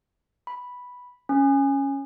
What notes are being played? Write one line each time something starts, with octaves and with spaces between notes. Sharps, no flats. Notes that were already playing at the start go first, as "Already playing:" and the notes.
B5
C#4